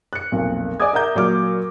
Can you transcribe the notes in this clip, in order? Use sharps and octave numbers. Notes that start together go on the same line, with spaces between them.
F#6 C#7
B1 F2 A#2
D5 D#5 G#5 D6 D#6 G#6
A#4 E5 F#5 A#5 G6
A#2 F#3 D5 D6 F6